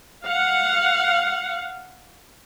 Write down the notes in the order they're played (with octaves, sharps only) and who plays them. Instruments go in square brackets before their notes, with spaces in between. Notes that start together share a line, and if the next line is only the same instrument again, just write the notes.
[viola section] F5 F#5